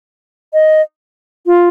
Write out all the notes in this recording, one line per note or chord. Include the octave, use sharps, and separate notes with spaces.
D#5
F4